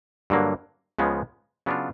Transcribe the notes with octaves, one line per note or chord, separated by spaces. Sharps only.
G2 D3 F#3 A#3
C#2 C#3 F3 G#3 B3
C#3 F#3 B3 D4 F4